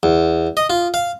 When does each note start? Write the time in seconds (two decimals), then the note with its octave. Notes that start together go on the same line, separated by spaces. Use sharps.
0.03 E2
0.57 D#5
0.70 F4
0.94 F5